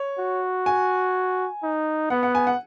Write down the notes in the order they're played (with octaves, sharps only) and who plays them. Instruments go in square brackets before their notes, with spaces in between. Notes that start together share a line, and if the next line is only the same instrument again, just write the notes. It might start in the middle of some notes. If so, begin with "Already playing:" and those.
Already playing: [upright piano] C#5
[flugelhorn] F#4
[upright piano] G#5
[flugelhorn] D#4
[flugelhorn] B3 [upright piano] F#5
[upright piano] F#5
G#5
F#5